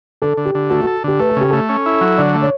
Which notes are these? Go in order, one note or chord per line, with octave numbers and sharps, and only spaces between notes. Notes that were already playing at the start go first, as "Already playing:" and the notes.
D3 A4
D3
G4
D3
A3 F#4
F#4 A4
D3 G4
A3 B4
A4
C#3 G4
A3 A4
C#4
E4
F#3
D3 D5
A3
C#5